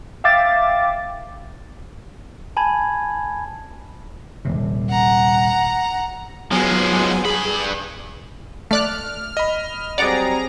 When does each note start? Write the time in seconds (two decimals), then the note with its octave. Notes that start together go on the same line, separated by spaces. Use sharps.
0.24 E5 F5 G5 D6 A6
2.57 G#5 A5 B5 G#6
4.45 D#1 G#1 C3
4.90 F#5 A#5
6.51 F3 F#3 G#3 B3 G#5
7.25 G2 G#4 B5
8.71 A3 D5 F6 F#6
9.37 D#5 B5
9.98 F#3 G3 C4 G#4 D5 F#5 A#5 D6